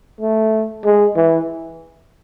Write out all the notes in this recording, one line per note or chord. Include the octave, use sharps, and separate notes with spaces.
A3
G#3
E3